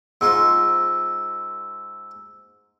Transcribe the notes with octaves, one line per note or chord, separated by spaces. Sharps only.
G#2 G#3 F4 E6